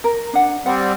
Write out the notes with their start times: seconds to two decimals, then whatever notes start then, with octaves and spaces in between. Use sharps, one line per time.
0.04 A#4
0.33 D4 F#5
0.66 G3 C4 F#5